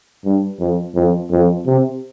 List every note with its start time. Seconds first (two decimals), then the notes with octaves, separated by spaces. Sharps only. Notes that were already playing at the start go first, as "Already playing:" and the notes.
0.25 G2
0.60 F2
0.95 F2
1.32 F2
1.67 C3